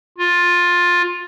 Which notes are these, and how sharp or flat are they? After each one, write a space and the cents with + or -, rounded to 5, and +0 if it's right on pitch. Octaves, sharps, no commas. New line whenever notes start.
F4 +15